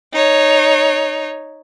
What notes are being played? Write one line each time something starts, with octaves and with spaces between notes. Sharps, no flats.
D#4 C#5